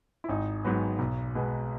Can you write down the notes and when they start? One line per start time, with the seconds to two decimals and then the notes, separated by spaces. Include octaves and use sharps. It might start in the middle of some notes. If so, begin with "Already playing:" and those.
0.24 E4
0.29 G#1 D#4
0.64 G#2 F#3 B3
0.99 B1
1.35 B2 G#3 B3